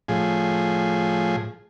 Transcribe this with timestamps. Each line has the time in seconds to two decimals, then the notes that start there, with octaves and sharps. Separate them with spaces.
0.08 A2 F3 G#4